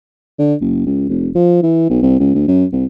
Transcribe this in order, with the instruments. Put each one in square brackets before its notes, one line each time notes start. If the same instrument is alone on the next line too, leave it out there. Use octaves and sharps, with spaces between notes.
[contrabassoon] D3
F#1
C#2
F1
F3
E3
B1
C2
C#2
D2
F#2
C2